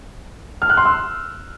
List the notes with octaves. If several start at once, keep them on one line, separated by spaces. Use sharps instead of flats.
F6
F#6
C6
E6